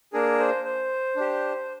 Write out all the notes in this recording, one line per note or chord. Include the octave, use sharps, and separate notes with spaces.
A#3 D4 G#4 A#4
C5
C5
D4 G4